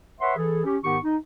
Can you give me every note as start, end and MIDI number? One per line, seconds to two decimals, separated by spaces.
0.21 0.35 71
0.21 0.35 73
0.21 0.35 76
0.21 0.35 78
0.21 0.35 84
0.36 0.65 52
0.36 0.65 68
0.36 0.65 69
0.65 0.77 61
0.65 0.77 67
0.84 0.98 44
0.84 0.98 51
0.84 0.98 59
0.84 0.98 63
0.84 0.98 67
0.84 0.98 85
1.03 1.17 63